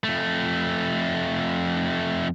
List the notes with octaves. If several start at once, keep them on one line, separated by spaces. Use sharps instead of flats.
F2 A3